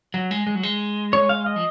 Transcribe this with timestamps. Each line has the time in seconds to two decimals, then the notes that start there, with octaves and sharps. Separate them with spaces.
0.14 F#3
0.31 G#3
0.47 G#3
0.55 F#3
0.63 G#3
1.13 C#5
1.29 F5
1.46 D#5
1.56 F3